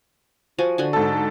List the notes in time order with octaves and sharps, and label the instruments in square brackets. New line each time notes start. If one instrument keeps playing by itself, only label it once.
[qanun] F3 F#4 G#5
D3 F#4 G#5
[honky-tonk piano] G#2 A4